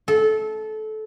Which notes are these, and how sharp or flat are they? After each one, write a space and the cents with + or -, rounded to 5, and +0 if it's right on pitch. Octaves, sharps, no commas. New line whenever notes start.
A4 -20